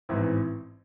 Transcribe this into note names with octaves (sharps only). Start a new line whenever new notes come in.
A1 G#2 E3 C4 E4